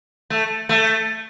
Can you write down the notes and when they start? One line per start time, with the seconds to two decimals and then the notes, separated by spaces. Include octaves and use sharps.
0.30 A3
0.69 A3